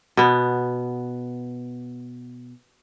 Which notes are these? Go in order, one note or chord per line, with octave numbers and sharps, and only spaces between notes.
B2 B3